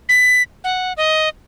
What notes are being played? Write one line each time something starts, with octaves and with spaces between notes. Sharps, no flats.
B6
F#5
D#5